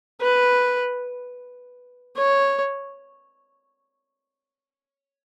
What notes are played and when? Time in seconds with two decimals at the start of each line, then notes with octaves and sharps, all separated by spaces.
0.21 B4
2.17 C#5